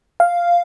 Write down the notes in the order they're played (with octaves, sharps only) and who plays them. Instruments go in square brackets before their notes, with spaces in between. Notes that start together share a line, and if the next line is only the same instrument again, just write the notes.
[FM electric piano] F5